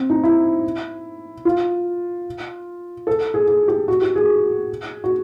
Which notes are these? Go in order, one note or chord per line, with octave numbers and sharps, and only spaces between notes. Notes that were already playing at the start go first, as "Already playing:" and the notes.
Already playing: C4
D#4
E4
F4
A4
G#4
G#4
G4
F#4
G4
G#4
F#4